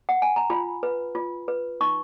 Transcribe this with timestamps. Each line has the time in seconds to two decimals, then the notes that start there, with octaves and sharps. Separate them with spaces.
0.09 F#5
0.22 G#5
0.36 A#5
0.50 F4 B5
0.83 B4
1.15 F4
1.48 B4
1.81 D#4 C#6